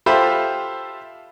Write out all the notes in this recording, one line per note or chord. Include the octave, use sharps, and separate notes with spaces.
F4 G4 A4 C5 E5 B5